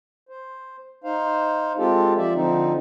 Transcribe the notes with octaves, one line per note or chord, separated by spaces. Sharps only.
C5
D#4 C5 F5
G#3 C4 F4 G4 A4
F3 D5 E5
D3 F3 C4 D#4